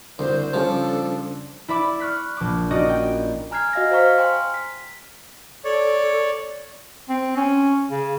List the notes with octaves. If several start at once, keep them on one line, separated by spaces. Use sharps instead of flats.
C2 D3 F#4 C5
C#3 F3 G3 C#4 D4 A4
E4 D5 E5 B5 D6
C#6 F6 F#6 B6
A#1 D6
C#4 D#4 F#4 A#4 D5 D#5
G5
G#5 A#5 F6 F#6 G#6 C7
F#4 D#5 F5 F6 A#6
C5 F5 A#5 C#6 F6 B6
G5 G#5 A#5 C6 F6
B6
A4 C#5 D5
C4
C#4
C#3